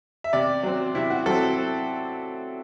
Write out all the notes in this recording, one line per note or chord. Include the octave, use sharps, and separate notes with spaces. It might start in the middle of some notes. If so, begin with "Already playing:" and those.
E5
C3 D5
F#3 C4
C3 E4
F#4
F#3 C4 A4